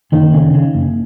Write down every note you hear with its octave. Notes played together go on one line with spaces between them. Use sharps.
F#1 D#3
C#3
C#3
F#1